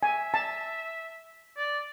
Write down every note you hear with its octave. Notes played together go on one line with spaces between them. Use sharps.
E5 G#5
A5
D5